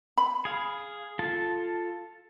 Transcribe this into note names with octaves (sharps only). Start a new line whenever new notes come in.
B5
G#4 F5
F4 A4 A5